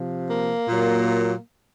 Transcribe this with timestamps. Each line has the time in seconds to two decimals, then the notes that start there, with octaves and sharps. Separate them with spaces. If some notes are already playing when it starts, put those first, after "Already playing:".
Already playing: C3 F3
0.29 A#3
0.69 A#2 F#3